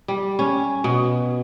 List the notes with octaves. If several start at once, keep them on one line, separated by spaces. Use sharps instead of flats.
G3
C#4
B2